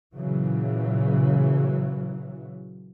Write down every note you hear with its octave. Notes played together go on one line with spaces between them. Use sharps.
A#2 C#3 E3 F#3